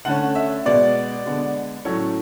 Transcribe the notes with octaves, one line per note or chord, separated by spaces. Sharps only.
D3 A3 C#4 F#5
E5
B2 G#3 B3 D5
D3 G#3 B3
A2 F#3 A3 C#4 C#5